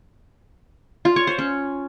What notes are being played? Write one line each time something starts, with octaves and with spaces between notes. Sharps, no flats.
F4
C#5
C5
C#4